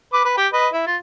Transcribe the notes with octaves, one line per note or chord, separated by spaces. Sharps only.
B4 D6
B4
G4 G5
B4 D#5
E4
F4